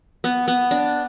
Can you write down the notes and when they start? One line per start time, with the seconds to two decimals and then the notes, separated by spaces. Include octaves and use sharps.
0.24 B3
0.48 B3
0.71 D4